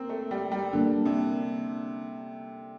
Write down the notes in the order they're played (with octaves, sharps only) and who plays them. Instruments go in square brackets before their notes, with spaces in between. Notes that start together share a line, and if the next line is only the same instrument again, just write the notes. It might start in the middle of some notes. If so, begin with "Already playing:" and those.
Already playing: [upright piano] A#3 C4
A3
G3
G3
[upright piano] D3 [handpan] G3 A#3 D4
[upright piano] C3